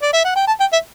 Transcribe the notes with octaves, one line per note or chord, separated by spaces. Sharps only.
D5
E5
F#5
G5
A5
G5
E5